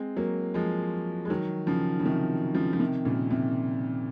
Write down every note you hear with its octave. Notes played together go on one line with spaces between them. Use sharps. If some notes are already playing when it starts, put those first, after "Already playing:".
Already playing: G#3 C4
F#3 A#3
F3 G#3
G#3
D#3 F#3
C#3 F3
C#3
C3 D#3
C#3 F3
F3
C3 D#3
A#2 C#3
C3